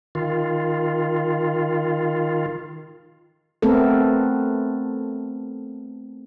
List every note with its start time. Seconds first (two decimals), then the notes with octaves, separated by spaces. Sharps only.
0.15 D#3 F4
3.62 A3 B3 C4 A4 A#4